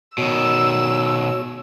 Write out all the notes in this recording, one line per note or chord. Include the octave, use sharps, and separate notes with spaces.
B2 D#3 F#4 C#5 E6